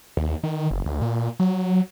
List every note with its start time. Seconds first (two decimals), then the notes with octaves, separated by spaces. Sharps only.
0.17 D#2
0.43 D#3
0.71 F#1
0.86 D2
1.01 A#2
1.40 F#3